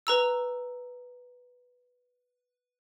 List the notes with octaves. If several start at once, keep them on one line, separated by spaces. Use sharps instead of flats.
B4 A#5 E6